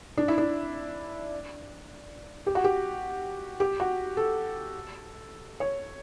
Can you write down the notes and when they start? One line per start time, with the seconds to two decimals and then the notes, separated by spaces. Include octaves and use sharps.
0.17 D4
0.28 E4
0.38 D4
2.46 G4
2.55 F#4
2.64 G4
3.60 G4
3.80 F#4
4.17 A4
5.60 C#5